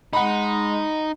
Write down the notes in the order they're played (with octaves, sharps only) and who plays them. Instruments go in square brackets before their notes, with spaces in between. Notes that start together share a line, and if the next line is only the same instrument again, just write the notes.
[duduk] G#3 [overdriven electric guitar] D#4 [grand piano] F#5 B5